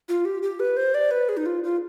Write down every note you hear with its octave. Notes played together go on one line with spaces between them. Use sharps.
F4
G4
G4
B4
C5
D5
B4
G#4
D#4
F4
F4